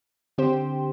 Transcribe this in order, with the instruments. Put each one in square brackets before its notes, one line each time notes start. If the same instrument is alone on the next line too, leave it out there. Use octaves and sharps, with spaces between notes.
[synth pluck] D3 C4 G4 C5